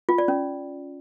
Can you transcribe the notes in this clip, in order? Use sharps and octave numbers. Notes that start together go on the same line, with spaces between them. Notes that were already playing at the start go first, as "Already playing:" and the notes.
F4
D5
C#4